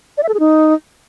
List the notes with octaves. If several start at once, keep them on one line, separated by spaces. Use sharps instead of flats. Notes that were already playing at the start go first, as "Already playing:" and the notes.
D5
E5
A4
G#4
D#4